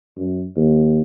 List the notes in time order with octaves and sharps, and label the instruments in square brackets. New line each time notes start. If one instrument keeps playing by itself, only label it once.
[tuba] F#2
D#2